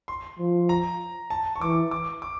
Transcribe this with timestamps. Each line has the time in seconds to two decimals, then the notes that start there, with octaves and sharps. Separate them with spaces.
0.08 C6
0.39 F3
0.69 A#5
1.30 A5
1.56 C#6
1.61 E3 D6
1.91 D6
2.22 D6